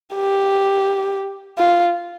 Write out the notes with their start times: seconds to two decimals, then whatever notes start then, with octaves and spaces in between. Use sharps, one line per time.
0.15 G4
1.58 F4